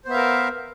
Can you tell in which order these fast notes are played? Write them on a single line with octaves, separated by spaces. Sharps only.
C5 B3 E5 F5 A#4